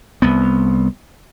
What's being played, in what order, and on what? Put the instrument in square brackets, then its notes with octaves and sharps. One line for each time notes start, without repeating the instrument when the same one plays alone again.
[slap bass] C2 B3